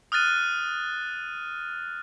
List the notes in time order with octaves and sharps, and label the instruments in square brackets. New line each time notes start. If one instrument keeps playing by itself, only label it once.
[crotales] D#6 F6 F#6 A6 D#7